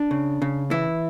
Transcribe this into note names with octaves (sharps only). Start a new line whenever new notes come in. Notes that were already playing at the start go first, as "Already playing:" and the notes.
Already playing: D4
C#3
C#3
E3 E4